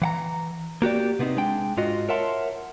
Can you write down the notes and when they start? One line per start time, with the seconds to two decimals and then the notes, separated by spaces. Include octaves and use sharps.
0.02 E3 F#5 A#5
0.82 A#3 F#4 G4 D5
1.19 C3 B3 C4 D#4
1.37 G#3 D4 G5
1.77 G#2 F4 F#4 D#5
2.09 A#4 C#5 E5 F#5 A5 C6